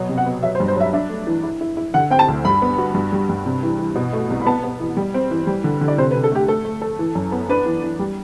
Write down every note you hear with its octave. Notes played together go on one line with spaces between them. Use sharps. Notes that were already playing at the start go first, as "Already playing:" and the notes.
Already playing: B2 F#3
C3
F#5
B3
F#3 E5
C5
G2
C5
F#3 E5
D4 E5
A3
E3
E4
E4
E4
D3 F#5
C4 G5
A5
D2
G2 B5
B3
F#4
G2
G3
G2
C3
E3
E3
B2
A3
C2
B5
B3 A5
B3
E3
G3
C4
E3
G3
D3
D3
D5
C3 C5
B4
C3
A4
A3 G4
A3 A4
A3
A4
E3
F#2
B3
D4 B4
E3
E3
G3